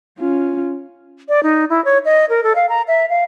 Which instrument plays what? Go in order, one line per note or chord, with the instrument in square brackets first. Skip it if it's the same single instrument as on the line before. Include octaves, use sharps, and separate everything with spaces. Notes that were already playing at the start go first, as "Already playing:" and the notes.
[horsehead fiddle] C#4 F4
[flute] D5
D#4
E4
C#5
D#5
A#4
A4
F5
A#5
E5
F5